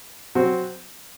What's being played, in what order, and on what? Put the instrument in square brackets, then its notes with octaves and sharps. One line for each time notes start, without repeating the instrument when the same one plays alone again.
[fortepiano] F#3 C4 F#4